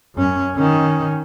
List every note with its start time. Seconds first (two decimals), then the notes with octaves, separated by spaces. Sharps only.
0.15 F#2 C#4
0.56 D#3 C#4